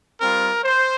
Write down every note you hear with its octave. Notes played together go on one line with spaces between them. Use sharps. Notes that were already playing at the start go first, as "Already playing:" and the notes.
G3 C4 F4 A#4
C5